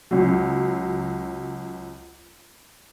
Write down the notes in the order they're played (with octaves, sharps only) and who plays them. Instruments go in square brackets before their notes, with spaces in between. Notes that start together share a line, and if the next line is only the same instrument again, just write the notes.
[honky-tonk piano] C#2 F#3